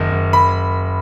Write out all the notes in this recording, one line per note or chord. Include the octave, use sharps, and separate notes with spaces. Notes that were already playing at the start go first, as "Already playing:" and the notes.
Already playing: F#1 D#3
F#1
B5